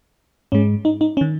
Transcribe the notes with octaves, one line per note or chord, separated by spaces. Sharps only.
G#2 G#3 C#4
D#4
D#4
C#4
D#3